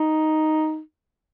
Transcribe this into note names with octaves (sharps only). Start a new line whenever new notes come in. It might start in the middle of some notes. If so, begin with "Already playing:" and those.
Already playing: D#4